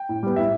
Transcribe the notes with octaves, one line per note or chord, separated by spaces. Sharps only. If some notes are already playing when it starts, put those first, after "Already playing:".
Already playing: G5
A2
G3 B3
A2 E5